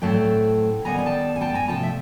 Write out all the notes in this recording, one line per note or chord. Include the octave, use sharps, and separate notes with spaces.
A2 F#3 A3 C4 G5 A5
D#3 G3 B3 G#5 A#5
G#5
G5 A5
G#5
G5 A5
G#5 A#5
C3 F3 A3 G5 A5
E5